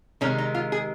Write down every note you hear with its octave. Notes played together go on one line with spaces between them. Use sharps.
C3 D#3 G#3 C#4
D#4
F4
G#4